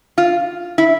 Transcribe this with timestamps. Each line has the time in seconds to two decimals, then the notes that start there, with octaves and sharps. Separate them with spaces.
0.18 F4
0.78 E4